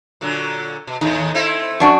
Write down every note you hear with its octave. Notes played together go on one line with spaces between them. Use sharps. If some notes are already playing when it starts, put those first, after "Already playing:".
A#2 D3 F#3
B2
D#2 A2 D#3 D#4
A3 C4 E4
F#2 D4 F#4